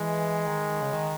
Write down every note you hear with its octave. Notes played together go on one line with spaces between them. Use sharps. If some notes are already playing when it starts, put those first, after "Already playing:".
Already playing: E3 G#3
D#3
C#3
D#3